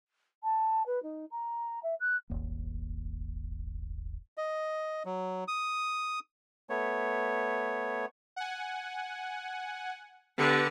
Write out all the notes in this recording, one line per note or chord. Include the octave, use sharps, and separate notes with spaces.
A5
B4
D#4
A#5
E5
F#6
D#1 G#1 D#2 A#3
D#5
F#3
D#6
A3 B3 C#5
F#5 G#5
D3 B3 G4 B4 C#7